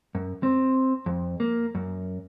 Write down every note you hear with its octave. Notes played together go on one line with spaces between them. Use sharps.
F#2
C4
F2
A#3
F#2